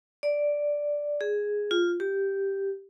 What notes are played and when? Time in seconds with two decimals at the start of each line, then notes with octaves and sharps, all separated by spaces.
0.23 D5
1.21 G#4
1.71 F4
2.00 G4